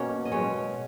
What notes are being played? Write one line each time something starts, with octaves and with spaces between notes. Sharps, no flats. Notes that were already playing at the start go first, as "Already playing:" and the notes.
Already playing: B2 A#3 C#4 C#5
D#5
B2 G#3 C#4 C#5